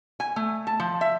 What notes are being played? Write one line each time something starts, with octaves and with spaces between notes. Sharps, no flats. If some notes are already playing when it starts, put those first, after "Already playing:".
G#5
A3
A5
F3
E5